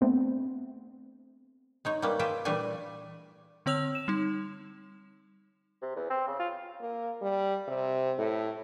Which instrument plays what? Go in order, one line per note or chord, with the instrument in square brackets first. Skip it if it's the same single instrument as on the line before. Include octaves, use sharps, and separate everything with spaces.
[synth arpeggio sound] A3 B3 C4 D4
[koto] G#3 D#4 C#5
G3 A#3 B3 C#4
F4 G4 G#4 E5 G5
A#2 E3 G3 A3 D4 G#5
[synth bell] D3 C4 C#5 E6 F7
E7
G3 D#4
[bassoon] C3
E2
C4
C#3
F4
[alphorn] A#3
G3
C3
A2